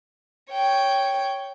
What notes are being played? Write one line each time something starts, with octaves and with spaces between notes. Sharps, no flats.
C#5 G5